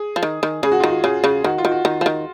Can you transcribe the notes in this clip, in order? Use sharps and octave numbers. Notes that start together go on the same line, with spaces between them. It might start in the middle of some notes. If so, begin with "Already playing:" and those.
Already playing: G#4
F3
D#3
D#3
C#3 G#4
F#4
F4
D#3 F#4
C#3 G#4
C#3
D#3 F#4
F4
D#3
F#4
D#3
F3
D#3